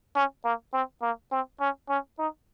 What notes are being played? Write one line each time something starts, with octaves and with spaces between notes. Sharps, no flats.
C#4
A#3
C4
A#3
C4
C#4
C#4
D#4